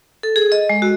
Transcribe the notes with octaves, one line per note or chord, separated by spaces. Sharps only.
A4
G#4
D#5
G#3
F#4